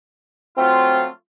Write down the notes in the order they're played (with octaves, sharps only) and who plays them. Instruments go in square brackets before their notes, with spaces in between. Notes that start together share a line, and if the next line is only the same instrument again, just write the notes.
[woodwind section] F#3 A3 F4 [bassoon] C4